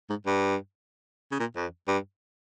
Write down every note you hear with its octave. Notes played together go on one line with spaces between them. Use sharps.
G#2
G2
C#3
A#2
F2
G2